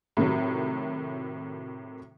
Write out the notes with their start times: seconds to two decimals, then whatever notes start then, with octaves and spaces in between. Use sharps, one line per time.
0.17 A2 C3 D#3 F#3